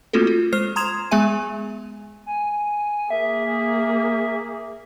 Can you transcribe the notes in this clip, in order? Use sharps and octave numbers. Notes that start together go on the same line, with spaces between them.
A3 A#3 C4 F4 F#4 A4
F4
G#3 C5 F6 C7
A#5 C6 D#6 G#6 E7 F7
G#3 B3 G#4 E5 G#5 D#7
G#5
A#3 G#4 E5